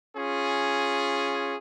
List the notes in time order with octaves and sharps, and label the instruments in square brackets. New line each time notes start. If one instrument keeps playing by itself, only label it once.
[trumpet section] C#4 F4 G#4